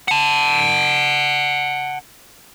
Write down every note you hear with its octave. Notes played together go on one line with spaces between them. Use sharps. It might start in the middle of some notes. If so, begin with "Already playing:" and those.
F#5 A5